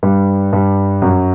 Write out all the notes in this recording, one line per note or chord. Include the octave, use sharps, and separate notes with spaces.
G2 G3
G2 G3
F#2 F#3